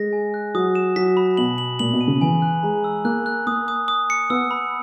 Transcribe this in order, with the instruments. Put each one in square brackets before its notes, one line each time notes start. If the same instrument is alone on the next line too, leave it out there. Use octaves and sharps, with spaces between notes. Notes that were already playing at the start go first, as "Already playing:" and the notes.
Already playing: [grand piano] G#3 [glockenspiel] A#6
[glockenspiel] G#5
F#6
[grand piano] F#3 [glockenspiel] D#6
[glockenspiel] E7
[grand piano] F#3 [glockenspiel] B6
[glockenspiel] B5
[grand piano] B2 [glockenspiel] F#7
[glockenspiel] F#7
[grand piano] A#2 [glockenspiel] F#7
[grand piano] B2
[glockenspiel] D#7
[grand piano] C#3
[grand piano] E3 [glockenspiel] G#5
[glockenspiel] F#6
[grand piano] G#3 [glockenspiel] A#5
[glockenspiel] E6
[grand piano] A#3 [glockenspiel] F#6
[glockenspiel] F#6
[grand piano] A#3 [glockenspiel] D#6
[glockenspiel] D#6
D#6
C#7
[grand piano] B3 [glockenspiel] E6
[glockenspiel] B5